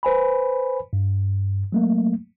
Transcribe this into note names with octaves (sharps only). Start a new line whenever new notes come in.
B4 C5 G#5 B5
G2
F#3 A3 A#3